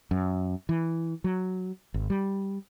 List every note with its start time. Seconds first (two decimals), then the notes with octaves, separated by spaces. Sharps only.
0.11 F#2
0.69 E3
1.24 F#3
1.94 G#1
2.10 G3